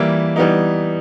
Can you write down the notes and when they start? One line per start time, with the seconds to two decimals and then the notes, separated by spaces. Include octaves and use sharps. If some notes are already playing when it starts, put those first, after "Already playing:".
Already playing: E3 G3 A#3 E4
0.36 E3 G3 B3 D#4